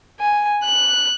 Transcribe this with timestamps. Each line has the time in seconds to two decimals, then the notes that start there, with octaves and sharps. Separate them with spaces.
0.20 G#5
0.64 F#6